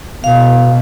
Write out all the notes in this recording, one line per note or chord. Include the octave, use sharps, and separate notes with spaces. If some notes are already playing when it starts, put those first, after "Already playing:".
B2 F5